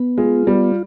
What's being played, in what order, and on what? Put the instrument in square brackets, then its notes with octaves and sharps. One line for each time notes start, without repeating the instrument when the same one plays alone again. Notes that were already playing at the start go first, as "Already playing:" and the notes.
Already playing: [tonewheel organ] B3
[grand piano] G#3 [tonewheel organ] F4
[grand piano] G3 [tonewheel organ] B3